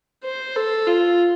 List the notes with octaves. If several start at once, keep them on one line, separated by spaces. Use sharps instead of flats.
C5
A4
F4